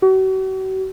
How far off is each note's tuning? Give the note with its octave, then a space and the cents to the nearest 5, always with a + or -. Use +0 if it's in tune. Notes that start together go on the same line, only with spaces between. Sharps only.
F#4 +40